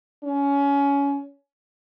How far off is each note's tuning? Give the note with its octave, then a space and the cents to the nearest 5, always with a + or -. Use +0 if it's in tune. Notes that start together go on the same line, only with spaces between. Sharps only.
C#4 +20